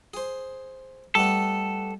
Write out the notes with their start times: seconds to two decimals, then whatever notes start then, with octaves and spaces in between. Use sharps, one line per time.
0.14 G#4 C5
1.15 G3 A3 B3 A4